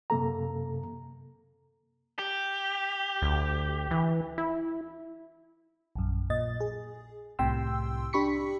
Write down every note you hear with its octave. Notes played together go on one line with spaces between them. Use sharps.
F#2 C3 A#3 A4 A#5
G4
D2
E3
E4
A#1 F#2
A#2 D#5 A6
G#4
C2 A2 C3 G5 C6 E6
D4 G4 B5 C#6 B6 C#7